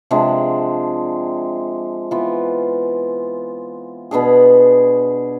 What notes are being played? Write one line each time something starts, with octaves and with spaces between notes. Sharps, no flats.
C3 F3 G#3 D4
E3 B3 F4
B2 B3 D4 G#4